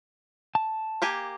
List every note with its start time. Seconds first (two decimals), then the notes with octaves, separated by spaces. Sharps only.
0.55 A5
1.02 A#3 G4 G#5